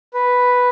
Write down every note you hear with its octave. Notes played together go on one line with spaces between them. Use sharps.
B4